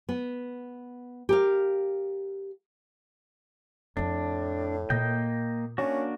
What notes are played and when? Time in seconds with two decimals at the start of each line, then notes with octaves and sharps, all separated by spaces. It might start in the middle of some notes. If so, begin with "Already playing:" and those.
0.09 B3
1.29 G4 A#4 F5
3.97 F2 A2 D4 E4
4.90 A#2 A#3 D#5 G5
5.78 A#3 C#4 D4 F#4